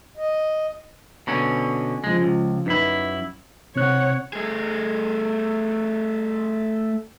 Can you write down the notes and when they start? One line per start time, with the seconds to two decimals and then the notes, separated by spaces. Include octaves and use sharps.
0.17 D#5
1.27 B2 D3 C#4
2.04 C#3 F3 G#3
2.23 C#2
2.66 F#2 D#4 E4 B4 B6
3.76 C3 C4 C#5 F#5 F#6
4.33 A3 G#4